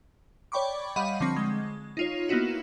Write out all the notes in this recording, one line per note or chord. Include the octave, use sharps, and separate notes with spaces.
C#5 D5 G5 B5 C#6 D6
G3 D#5 F5 F#5 B5 D#7
D3 F3 C4 C#6 A#6
G#3
D#4 F4 C#5
A#3 B3 D#4 E4 F#4